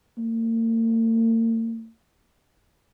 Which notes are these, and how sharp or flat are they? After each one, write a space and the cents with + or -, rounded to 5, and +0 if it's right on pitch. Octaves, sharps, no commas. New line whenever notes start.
A#3 -45